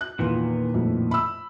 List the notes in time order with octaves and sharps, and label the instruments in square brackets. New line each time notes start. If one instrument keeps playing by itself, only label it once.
[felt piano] F#6
[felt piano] E2 F4 [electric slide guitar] A#2 D#3 B3
[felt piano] F2 A2
B5 E6